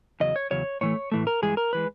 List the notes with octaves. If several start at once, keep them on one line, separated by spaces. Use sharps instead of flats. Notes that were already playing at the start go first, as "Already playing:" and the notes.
E2 C#3 F#3 D#5
C#5
E2 C#3 F#3 C#5
A2 E3 A3 C#5
A2 E3 A3
A#4
G2 E3 G#3 G#4
A#4
E3 G#3 B4